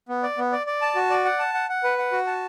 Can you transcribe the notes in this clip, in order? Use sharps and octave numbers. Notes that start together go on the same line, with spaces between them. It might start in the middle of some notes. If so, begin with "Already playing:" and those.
B3
D5
B3
D5
D5
A5
F#4
D5
F#5
A5
F#5
F#5
B4
F#5
F#4
A5